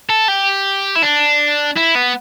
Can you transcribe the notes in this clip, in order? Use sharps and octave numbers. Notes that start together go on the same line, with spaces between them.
A4
G4
E4
D4
E4
B3